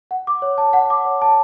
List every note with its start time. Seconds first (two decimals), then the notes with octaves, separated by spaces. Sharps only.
0.11 F#5
0.27 D6
0.42 C#5
0.58 A5
0.73 F#5
0.90 D6
1.05 C#5
1.22 A5